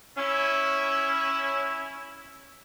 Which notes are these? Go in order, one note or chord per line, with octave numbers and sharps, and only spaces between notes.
C#4 E4